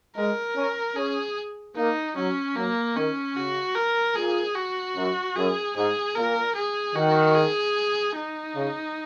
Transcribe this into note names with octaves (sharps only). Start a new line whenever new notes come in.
G#3 A#4
C#4
C#4 G#4
A#3 D#4
F#3 C#4
F#3 A#3
D#3 C#4
C#3 F#4
A#4
A#2 G#4
F#4
F#2
F#2 G#4
G#2 G#4
A#2 A#4
G#4
D#3 F#4
G#4
D#4
C#3